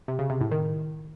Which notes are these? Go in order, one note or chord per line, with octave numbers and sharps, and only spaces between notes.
C3
C#3
C3
A2
D#3